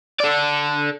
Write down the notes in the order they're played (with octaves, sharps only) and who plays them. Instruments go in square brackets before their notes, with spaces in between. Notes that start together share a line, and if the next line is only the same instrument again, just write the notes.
[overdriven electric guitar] A4 D5